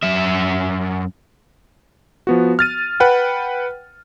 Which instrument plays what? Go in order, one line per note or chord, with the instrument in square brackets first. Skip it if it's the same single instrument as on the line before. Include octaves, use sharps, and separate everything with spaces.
[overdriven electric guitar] F#2 E5
[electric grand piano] F3 B3 F#4
F6 A6 D#7
B4 F#5 G5